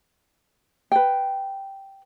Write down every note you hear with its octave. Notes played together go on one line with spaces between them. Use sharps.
B4 G5